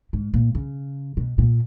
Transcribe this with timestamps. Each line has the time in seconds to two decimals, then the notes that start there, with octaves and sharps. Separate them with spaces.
0.13 G#2
0.34 A#2
0.55 C#3
1.17 B2
1.38 A#2